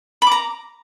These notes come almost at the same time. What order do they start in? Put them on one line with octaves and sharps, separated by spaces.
B5 D6 A#5